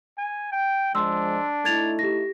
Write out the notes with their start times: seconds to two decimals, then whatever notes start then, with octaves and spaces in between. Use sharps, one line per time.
0.18 G#5
0.52 G5
0.95 F3 G#3 D4 C6 E6
1.65 A3 D#4 E4 G#6 A6 F7
1.99 G4 A#6